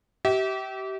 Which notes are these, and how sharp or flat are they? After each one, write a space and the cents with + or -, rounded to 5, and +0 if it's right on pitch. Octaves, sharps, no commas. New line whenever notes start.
G4 -30 E5 -30